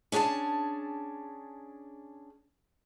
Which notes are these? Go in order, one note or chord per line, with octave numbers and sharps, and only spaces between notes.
C#4 D4 G#4 G5 A5